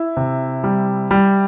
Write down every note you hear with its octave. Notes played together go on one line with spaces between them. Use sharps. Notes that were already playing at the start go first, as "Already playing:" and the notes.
Already playing: E4
C3
G3
G3